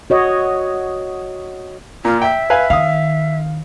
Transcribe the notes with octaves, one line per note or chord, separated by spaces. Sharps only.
F#4 C#5 D#5
A#2 F4
E5 G5
B4 F5 G#5
D#3 F5 D#6